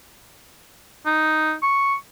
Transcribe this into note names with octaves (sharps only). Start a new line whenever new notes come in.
D#4
C#6